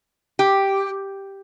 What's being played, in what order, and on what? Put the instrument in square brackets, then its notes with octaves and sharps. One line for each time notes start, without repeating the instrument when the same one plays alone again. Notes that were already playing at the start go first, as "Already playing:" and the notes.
[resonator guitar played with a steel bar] G4